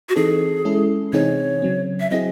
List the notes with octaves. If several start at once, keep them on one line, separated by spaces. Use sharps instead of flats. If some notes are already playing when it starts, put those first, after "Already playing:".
F#4
E3 C4 D#4 G#4 A4
G#3 C#4 E4 A4
C3 E3 C4 D#4 G#4 C#5
C#3 F#3 C4
E5
F#3 C4 E4 G#4 D#5